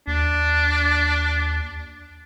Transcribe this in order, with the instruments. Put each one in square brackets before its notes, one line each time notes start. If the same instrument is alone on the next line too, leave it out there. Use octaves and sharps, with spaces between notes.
[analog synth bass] D#2 [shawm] D4